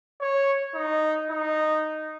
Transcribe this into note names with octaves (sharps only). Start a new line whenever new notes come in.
C#5
D#4
D#4